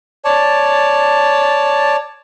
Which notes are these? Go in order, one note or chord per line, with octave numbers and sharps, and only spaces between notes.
C#5 D5 A5